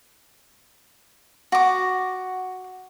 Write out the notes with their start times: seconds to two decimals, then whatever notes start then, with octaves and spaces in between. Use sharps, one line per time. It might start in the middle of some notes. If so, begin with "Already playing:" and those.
1.52 F#4 D6